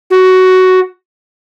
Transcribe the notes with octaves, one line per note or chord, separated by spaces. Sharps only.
F#4